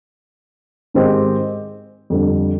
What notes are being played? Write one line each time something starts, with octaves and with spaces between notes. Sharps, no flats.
G#2 D#3 G#3 C4 G4
F2 D3 G3